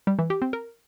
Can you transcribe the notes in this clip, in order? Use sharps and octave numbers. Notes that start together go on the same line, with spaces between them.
G3
E3
G4
C4
A#4